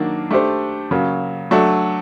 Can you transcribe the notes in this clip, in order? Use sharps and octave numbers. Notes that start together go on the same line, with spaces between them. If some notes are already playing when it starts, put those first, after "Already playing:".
Already playing: D#3 F#3 A#3 D4
A3 D4 G4 C5
C#3 F#3 A#3
F#3 A3 D4